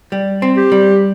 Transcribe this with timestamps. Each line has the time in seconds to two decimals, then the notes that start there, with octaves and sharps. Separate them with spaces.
0.12 G3
0.42 C4
0.57 G4
0.72 G3